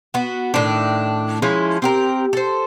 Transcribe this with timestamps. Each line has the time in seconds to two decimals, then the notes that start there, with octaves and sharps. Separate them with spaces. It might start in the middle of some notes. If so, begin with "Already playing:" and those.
0.14 B3 F#4
0.54 A2 D#3 D4
1.42 F3 G#3 C#4 E4
1.82 C4 G4 A#4
2.33 A4 C5